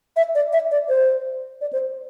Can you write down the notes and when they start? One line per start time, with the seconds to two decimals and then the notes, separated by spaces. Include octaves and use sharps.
0.16 E5
0.35 D5
0.53 E5
0.71 D5
0.89 C5
1.61 D5
1.73 C5